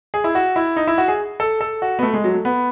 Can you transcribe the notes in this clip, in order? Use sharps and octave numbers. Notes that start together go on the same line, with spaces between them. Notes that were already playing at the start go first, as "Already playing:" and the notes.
G#4
E4
F#4
E4
D#4
E4
F#4
G#4
A4
A4
F#4
B3
A3
G#3
F#3
A3
B3